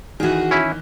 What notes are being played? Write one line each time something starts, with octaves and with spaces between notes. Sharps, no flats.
D#3 E3 F#4 G#4
C#4 E4